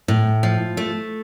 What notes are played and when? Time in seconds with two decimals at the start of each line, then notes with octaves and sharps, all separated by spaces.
0.08 A2
0.43 F3
0.77 A3